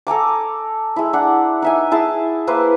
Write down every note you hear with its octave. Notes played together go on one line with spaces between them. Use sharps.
A4 G#5 A#5 D6
G#3 E4
D4 F#5
D#4 E5 G#5
E4 G#4 A5
A#3 E4 B4 C5